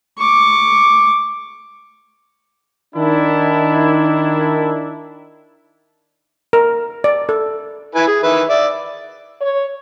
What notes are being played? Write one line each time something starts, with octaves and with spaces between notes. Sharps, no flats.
C#6 D6
D#3 D4 E4
A#4
D5
A4
E4 B4 G#5
G#4
D#3 B4 E5
D5 E5
C#5